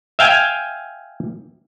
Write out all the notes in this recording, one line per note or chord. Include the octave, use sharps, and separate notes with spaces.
E5 F5 G5 G#5